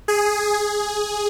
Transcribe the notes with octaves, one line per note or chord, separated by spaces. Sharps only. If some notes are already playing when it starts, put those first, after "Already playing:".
G#4
G#4